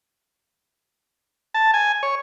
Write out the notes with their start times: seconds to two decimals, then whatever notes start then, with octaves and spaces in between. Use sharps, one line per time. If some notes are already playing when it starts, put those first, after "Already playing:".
1.54 A5
1.74 G#5
2.03 C#5